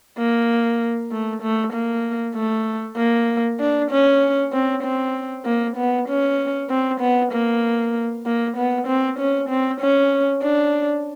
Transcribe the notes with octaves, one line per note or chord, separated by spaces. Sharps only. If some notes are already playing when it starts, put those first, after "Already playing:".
A#3
A3
A3
A#3
A3
A#3
D4
C#4
C4
C4
A#3
B3
C#4
C4
B3
A#3
A#3
B3
C4
C#4
C4
C#4
D4